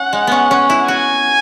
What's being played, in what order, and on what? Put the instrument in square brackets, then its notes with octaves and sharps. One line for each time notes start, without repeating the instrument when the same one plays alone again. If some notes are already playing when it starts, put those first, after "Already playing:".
Already playing: [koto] C#4 [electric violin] F#5
[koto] G#3
B3 C#4
C#4
E4
[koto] F#4 [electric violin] G#5